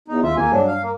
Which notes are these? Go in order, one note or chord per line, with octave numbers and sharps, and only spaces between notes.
E2 D#4
D#2 F4 E5
D#2 A#3 G#5
G2 F#3 D4
F5
A#3